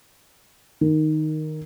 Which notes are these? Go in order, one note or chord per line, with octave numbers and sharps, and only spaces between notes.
D#3